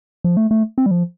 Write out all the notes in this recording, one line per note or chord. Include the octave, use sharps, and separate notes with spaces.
F3
A3
A3
C4
G3
F3